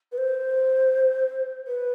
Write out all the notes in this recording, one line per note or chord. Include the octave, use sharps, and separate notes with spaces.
B4
C5
B4